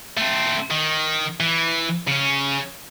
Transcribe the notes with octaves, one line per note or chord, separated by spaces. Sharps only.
A3 C4
D#3
E3
C#3 C#4